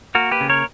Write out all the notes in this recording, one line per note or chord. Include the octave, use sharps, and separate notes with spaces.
A#3 F#4 A#4
G4 B4
C#3
A#4 C#5